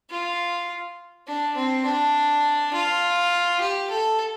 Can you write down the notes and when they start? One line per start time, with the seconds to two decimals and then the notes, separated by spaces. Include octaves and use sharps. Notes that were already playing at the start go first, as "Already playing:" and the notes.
0.10 F4
1.27 D4
1.56 C4
1.86 D4
2.74 F4
3.61 G4
3.90 A4